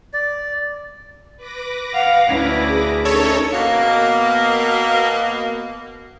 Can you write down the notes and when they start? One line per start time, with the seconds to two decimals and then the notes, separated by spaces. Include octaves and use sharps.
0.14 D5
1.37 B4 D6 A#6
1.94 F5 F#5
2.30 D2 C#4 E4
2.68 G#4
3.05 C#4 D#4 A4 A#4 C#5
3.54 B2 A#3